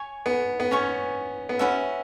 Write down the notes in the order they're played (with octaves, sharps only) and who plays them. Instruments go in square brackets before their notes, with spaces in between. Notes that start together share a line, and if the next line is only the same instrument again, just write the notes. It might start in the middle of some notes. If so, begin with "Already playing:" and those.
Already playing: [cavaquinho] C#5 G#5 C#6
[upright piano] B3
B3
[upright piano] C#4 [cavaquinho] C#5 G#5 C#6
[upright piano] B3
[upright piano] C#4 [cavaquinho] F#4 B4 E5